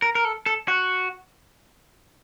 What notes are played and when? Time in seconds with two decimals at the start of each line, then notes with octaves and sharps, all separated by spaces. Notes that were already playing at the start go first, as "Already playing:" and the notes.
0.02 A#4
0.15 A#4
0.25 A4
0.46 A4
0.68 F#4